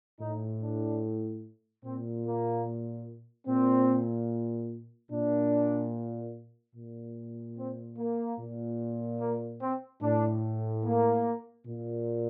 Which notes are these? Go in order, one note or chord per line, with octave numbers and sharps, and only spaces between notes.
A2 D#4
D4
A#2 C4
A#3
A#2 C4
A#2 D4
A#2
C4
A#3
A#2
A#3
C4
A2 D4
A#3
A#2